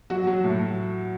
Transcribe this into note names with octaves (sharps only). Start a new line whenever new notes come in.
F#3 F#4
F#3
A2